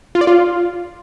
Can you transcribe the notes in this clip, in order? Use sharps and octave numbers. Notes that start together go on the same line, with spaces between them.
F4
D5
F4